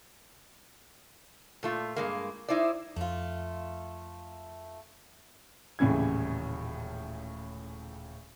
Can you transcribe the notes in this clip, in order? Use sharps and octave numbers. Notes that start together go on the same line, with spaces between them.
A#2 A3 F4
G2 G#3 A#3
D#4 E4 C5 D5
F2 A3 F4
D#1 A2 C#3 E3 G#6